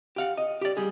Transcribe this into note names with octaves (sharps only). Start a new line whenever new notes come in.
G4 F5 F#5
D#5
G4 D5
G3 G#4